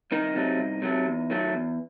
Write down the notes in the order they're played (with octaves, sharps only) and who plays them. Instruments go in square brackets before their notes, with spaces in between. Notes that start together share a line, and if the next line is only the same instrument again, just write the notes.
[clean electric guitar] C2 D#3 D#4
C3 F#3 A3
C2
C3 F#3 A3
E2
D#3 F#3 A3
E2